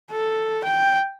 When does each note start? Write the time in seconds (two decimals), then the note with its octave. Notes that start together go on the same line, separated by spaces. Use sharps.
0.11 A4
0.64 G5